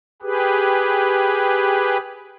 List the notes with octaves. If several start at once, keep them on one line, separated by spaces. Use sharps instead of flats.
G4 G#4 B4